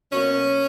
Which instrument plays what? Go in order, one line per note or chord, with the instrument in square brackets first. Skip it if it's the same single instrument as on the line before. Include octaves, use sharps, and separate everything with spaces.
[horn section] B2 F#3 A#3 C#4